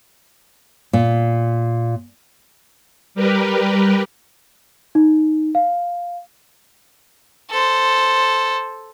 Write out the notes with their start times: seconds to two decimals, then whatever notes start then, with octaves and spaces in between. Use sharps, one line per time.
0.93 A#2
3.14 G3 G4 A#4 B4
4.95 D#4
5.55 F5
7.50 A4 C5